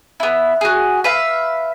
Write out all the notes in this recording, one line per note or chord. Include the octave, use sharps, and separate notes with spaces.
B3 E4
F#4 G#4
B4 E5 F5